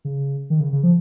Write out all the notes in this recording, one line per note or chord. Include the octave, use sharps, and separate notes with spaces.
C#3
D#3
C#3
C#3
F3